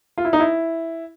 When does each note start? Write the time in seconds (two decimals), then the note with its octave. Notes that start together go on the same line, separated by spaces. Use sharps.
0.18 F4
0.25 E4
0.33 D#4
0.40 E4